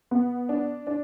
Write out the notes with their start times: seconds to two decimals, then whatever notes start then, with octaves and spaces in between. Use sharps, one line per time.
0.11 B3
0.49 D4
0.87 D4